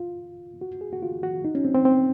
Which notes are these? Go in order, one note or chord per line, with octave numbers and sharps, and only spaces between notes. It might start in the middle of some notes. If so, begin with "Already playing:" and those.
Already playing: F4
F#4
G#4
F#4
F4
F#4
D#4
C#4
C4
C4
C4